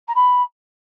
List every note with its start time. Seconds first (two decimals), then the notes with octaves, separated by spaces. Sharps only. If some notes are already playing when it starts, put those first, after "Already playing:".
0.08 A#5
0.15 B5